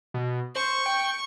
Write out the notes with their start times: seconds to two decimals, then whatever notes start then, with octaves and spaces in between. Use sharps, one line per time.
0.14 B2
0.56 C5 C#6
0.86 G5